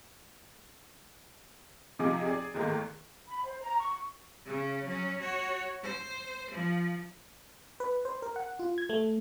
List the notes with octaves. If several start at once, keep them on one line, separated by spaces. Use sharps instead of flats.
C3 F3 D#4 G#4 D6
G#4 D5
E2 G#2 D#3 A3 A#3
B5
C5
A#5
C#6
C#3 C#4
F#3 C#4
F#4 C#5
C5
F3
B4
C5
A#4
F#5
F4
G#6
A3